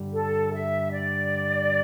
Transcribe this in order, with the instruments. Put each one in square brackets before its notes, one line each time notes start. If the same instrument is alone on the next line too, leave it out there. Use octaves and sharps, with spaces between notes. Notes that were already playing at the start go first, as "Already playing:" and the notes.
Already playing: [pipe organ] G2 D3 G3
[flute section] A4
E5
D5